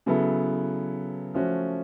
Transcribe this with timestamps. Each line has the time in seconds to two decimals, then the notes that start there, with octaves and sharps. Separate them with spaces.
0.06 C#3 F#3 B3 E4 A4
1.34 F3 A3 C#4 F#4